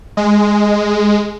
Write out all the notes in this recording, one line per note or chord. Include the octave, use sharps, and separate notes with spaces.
G#3